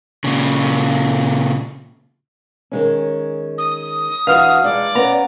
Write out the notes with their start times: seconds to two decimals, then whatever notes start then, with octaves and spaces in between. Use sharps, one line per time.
0.24 A#2 C#3
2.71 D#3 G#3 C#4
3.58 D#6
4.27 E3 D4 F#4 F5 F6
4.64 G#3 D#4 D5
4.95 B3 C#4 A#5